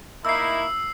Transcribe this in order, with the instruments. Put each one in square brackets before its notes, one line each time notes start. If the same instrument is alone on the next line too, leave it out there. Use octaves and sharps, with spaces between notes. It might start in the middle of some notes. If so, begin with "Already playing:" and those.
[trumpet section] A#3 D#4 E4 [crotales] E6 C7